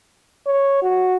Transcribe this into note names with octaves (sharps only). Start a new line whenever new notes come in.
C#5
F#4